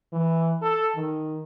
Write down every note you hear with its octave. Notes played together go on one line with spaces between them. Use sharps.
E3
A4
D#3